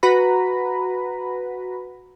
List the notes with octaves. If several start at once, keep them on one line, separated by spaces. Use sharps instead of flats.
F#4 B4 A#5 B5